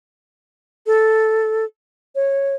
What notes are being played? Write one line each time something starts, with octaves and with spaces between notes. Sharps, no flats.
A4
C#5